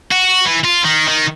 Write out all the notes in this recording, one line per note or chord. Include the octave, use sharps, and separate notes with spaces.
F#4
E3
F4
D#3
D#3